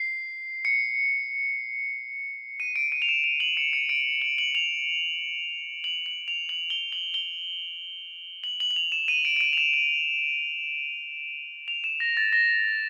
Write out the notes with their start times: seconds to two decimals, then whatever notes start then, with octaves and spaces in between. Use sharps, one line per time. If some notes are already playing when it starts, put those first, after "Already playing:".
Already playing: C7
0.65 C#7
2.60 D#7
2.76 D7
2.92 D#7
3.02 F7
3.09 E7
3.24 F7
3.40 F#7
3.57 C#7
3.73 C#7
3.89 D7
4.22 F#7
4.38 F#7
4.55 F7
5.84 F#7
6.06 F#7
6.28 F7
6.49 F#7
6.70 G7
6.92 F#7
7.14 G7
8.44 F#7
8.60 F#7
8.71 F#7
8.76 F7
8.92 E7
9.08 D#7
9.25 D7
9.36 D7
9.41 D#7
9.53 F7
9.58 E7
9.74 F#7
11.68 F7
11.84 E7
12.00 A#6
12.17 A6
12.33 A#6